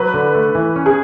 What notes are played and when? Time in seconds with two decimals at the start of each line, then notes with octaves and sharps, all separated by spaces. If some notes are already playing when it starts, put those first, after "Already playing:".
Already playing: F#3 B4
0.14 D3
0.35 A3
0.55 E3
0.76 C#4
0.86 G#4